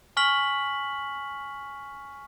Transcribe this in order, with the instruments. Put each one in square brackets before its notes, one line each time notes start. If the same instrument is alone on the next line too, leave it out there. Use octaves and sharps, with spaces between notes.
[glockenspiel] G#5 C#6 F6 B6 F#7